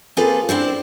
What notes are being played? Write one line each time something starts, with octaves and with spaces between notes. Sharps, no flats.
A#3 C4 F4 G#4 A4 B4
C4 D4 E4 C5